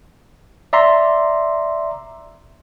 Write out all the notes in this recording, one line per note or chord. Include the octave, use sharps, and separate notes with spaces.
D5 E5 A#5 C6